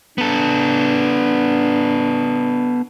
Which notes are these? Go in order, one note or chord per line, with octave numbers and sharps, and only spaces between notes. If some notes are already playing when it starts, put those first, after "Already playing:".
B3 D4 A4